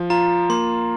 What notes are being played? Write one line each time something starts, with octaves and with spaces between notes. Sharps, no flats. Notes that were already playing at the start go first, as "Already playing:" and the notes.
Already playing: F3
F4 A#5
A#3 C6